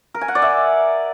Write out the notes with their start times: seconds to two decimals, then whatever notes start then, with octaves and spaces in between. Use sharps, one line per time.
0.14 A#4
0.21 G#5
0.28 F#5
0.35 D5
0.42 E5